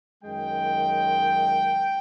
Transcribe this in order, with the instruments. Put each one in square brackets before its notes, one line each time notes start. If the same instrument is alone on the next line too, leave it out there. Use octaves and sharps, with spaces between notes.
[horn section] F#2 D#3 G#3 G5